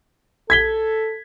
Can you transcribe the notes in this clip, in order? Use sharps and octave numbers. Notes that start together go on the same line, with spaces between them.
A4 G#6 B6 G7